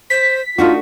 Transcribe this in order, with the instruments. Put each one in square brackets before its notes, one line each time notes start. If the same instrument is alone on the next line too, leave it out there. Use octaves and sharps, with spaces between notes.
[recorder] C5 [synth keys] B6
[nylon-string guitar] A3 D4 F#4 [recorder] D#4 [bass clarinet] F4